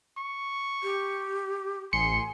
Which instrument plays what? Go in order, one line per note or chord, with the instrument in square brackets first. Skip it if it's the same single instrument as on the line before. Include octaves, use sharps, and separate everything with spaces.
[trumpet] C#6
[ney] G4
[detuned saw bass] A1 [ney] G#5 [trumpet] C6 [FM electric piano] C#7